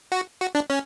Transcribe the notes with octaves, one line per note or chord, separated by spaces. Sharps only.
F#4
F#4
D4
C#4